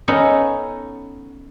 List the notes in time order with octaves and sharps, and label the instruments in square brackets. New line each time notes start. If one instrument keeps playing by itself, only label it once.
[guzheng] B3 C#4 D#4 A4